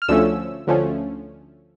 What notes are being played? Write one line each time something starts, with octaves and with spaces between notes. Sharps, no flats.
F6
D2 D3 F3 A3 C#4 E6
D2 D3 F3 A3 C#4